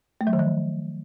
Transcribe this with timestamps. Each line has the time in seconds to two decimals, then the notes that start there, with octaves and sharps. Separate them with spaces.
0.21 A3
0.27 F#3
0.33 D#3
0.39 F3